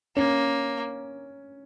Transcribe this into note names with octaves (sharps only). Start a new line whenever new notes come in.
A#3 C#4